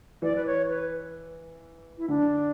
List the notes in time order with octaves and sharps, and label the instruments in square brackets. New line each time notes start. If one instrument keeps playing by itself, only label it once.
[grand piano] E3 [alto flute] D5
[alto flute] B4
C#5
B4
E4
[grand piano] D3 [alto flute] D4